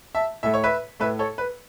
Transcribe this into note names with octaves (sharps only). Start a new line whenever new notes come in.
E5 A5
A2 A3 E5
C#5
B4 E5
A2 A3 B4 E5
A4 C#5
B4